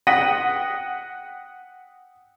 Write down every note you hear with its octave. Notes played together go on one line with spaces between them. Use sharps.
F#5 G5 D#6 A#6 B6 D#7